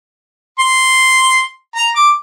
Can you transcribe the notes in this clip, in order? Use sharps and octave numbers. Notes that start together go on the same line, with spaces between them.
C6
A#5
D6